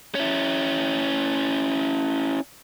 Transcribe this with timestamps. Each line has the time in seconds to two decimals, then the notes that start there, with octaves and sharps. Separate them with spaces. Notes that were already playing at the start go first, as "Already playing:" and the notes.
0.15 C#4 E4